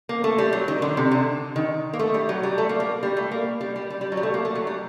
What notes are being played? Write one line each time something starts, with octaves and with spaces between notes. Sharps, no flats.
A#3
A3
G3
F#3
D#3
D3
C3
D3
D#3
A#3
A3
G3
F#3
G3
A3
A#3
A#3
G3
A3
A#3
G3
G3
G3
G3
F#3
G3
A3
A#3
A3
F#3
G3